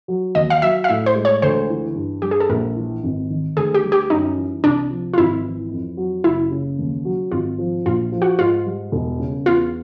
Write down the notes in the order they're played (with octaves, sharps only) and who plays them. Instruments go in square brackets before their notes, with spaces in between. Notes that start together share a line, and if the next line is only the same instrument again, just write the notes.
[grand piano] F#3
[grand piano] D#2 [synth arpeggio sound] D#5
[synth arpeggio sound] F5
[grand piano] F#3 [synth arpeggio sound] E5
[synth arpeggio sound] F5
[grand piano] A2 [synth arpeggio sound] E5
[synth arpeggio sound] C5
[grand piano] G#3
[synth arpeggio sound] C#5
[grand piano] D2 [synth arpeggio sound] C5
[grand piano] E3
G2
[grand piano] G3 [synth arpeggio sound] G4
[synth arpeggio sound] G#4
A4
[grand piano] A#1 [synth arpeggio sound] A#4
[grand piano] E3
G#1
D#3
[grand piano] D2 [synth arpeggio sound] G#4
[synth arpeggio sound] G4
[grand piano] G3
[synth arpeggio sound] G4
[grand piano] F#2 [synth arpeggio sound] D#4
[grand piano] E3
[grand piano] C2 [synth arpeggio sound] D4
[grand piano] F3
[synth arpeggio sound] F4
[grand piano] G#1 [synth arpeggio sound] E4
[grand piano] E3
F2
F#3
[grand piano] F#1 [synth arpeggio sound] E4
[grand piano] C#3
D#2
F#3
[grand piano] G#1 [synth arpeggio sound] F4
[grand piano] F3
[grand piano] A#1 [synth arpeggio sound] F4
[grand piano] F3
[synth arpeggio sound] F#4
[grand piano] G#2 [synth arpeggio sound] F4
[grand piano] G3
E1
C#3
[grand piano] E2 [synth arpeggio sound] F4